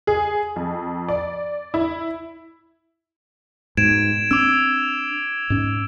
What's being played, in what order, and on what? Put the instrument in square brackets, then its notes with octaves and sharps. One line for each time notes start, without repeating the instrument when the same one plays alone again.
[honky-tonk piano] G#4
F2
D5
E4
[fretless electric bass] G#2 B2 [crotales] G#6 D7 E7
[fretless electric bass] C4 D4 [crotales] D6 E6
[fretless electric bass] G#2 C#4